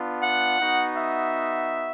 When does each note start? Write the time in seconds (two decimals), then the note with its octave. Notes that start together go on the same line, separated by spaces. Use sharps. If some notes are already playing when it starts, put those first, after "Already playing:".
Already playing: B3 D4 F4
0.24 F#5
0.60 B3 D#4 F#4
0.97 E5